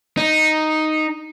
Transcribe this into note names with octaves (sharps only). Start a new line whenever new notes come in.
D#4